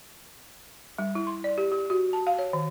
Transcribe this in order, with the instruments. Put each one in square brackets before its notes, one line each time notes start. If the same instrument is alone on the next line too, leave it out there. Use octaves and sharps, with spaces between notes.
[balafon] G3
E4
C6
D5
G4
G4
F#4
A5
F5
C#5
D#3